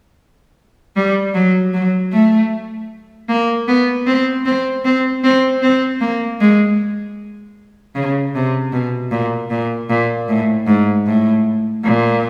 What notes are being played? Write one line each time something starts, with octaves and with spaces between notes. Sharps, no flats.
G3
F#3
F#3
A3
A#3
B3
C4
C4
C4
C4
C4
A#3
G#3
C#3
C3
B2
A#2
A#2
A#2
A2
G#2
A2
A#2